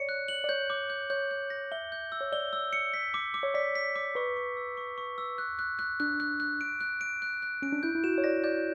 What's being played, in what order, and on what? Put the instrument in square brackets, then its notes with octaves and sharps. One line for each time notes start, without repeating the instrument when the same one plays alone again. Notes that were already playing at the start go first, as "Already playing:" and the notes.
Already playing: [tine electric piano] C#5 D5 [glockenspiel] C#7
[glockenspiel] F#6
F#7
[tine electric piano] D5
[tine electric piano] C#5 [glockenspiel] G6
[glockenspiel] D6
G6
[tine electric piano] C#5 [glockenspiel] G6
[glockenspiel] G6
A#6
[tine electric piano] E5 [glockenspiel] G7
[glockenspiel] G6
E6
[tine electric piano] C#5
[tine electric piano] D5 [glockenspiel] G7
[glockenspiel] E6
C#7
B6
D6
D6
[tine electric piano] C#5
[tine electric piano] D5 [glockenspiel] B6
[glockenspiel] B6
D6
[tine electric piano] B4 [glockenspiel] C#6
[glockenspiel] C#6
E6
C#6
C#6
E6
F#6
F#6
F#6
[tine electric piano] D4 [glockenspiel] F#6
[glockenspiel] F#6
F#6
D7
F#6
D7
F#6
F#6
[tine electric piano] C#4 [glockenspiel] D7
[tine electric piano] D4
[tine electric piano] E4 [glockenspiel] G6
[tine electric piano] E4
[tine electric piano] F#4 [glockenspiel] E7
[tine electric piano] C#5
[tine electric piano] D5 [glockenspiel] A#6
[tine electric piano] D5 [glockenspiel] G6